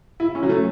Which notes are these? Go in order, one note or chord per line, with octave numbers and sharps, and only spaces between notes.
E4
C#4
F#3
A3